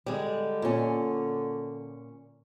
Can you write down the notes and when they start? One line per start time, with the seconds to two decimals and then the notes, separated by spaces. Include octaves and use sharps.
0.06 D3 G3 G#3
0.62 A#2 C#4